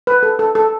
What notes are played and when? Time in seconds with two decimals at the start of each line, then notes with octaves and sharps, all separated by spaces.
0.07 B4
0.23 A4
0.39 A4
0.55 A4